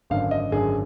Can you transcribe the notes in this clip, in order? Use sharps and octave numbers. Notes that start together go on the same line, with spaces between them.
G#1 F#2 D3 F5
D#5
G#1 F#2 D3 G#4